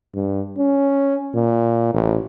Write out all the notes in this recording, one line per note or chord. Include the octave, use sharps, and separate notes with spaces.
G2
C#4
A#2
A1